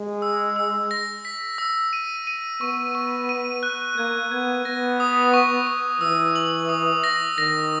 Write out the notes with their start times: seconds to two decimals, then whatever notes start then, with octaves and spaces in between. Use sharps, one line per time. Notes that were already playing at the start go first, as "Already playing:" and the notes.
Already playing: G#3
0.22 E6
0.56 E6
0.91 A#6
1.25 B6
1.58 E6
1.93 D#7
2.27 D#7
2.61 B3 C#6
2.95 C#6
3.29 D#7
3.63 F#6
3.97 A#3 G#6
4.31 B3 G#6
4.65 B3 A#6
5.00 D#6
5.34 C#6
5.67 C#6
6.01 E3 E6
6.36 F#7
6.69 D#6
7.04 A#6
7.38 D#3 A#6